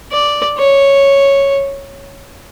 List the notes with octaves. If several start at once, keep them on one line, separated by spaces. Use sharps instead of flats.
D5
C#5